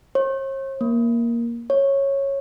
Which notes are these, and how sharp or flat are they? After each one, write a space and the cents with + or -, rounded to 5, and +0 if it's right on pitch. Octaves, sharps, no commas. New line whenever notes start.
C#5 -45
A#3 +10
C#5 -10